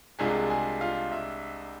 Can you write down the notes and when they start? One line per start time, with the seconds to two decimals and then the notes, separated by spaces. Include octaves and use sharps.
0.19 C2 C3 G#3 D4 F4 G#4 G#5
0.50 G#4 G#5
0.81 F4 F5
1.12 E5